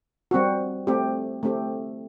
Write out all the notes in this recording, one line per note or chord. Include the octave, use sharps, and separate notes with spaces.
G3 C4 F#4
A3 C4 G4
A3 C4 G4